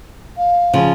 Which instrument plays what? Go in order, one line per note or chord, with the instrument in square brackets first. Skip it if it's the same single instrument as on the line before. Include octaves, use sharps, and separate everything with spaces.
[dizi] F5
[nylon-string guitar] C#3 F3